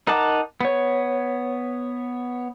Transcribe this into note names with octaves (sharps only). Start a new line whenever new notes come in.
D#4 A#4 F#5 A5 D6
B3 C#5